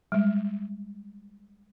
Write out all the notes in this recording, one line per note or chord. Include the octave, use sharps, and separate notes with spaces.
G3 G#3